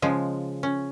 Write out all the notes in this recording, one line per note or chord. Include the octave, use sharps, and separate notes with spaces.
C#3 F3 G#3
C#4